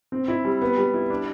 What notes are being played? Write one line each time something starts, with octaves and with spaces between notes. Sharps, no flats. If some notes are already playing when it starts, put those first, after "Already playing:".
C4
E4
G3
B3
G3
E4
D4